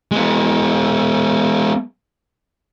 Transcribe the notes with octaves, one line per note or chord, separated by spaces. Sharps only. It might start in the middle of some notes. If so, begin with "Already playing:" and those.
G#3 B3